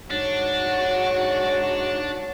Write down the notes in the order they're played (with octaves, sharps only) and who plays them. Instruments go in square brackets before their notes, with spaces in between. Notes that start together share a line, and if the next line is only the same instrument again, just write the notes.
[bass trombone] G#2 [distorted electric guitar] D4 [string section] F#4 [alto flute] C#5